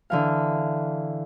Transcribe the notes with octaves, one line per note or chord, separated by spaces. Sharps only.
D3 E3 F5